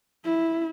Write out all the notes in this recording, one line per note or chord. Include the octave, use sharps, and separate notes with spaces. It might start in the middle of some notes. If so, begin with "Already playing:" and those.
E4